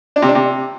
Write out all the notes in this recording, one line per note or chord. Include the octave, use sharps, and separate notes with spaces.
D4
C3
D4
C3